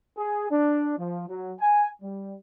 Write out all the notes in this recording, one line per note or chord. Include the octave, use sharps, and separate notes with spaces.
G#4
D4
F3
F#3
G#5
G3